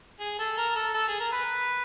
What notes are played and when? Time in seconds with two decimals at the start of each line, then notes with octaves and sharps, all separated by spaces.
0.20 G#4
0.39 A4
0.58 A#4
0.76 A4
0.95 A4
1.08 G#4
1.20 A#4
1.32 B4